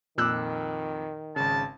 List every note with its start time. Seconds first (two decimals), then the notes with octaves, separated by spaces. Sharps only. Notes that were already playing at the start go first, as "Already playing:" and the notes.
0.18 F2 A#2 D#3 D6 E6 F#6
1.36 G#1 C#3 A5